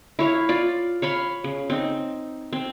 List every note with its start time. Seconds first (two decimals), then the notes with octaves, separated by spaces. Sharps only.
0.19 E4 C#5 F5
0.49 F4 D5
1.02 C#5 F5 B5 C6
1.44 C#3
1.70 C4 D#4
2.53 C4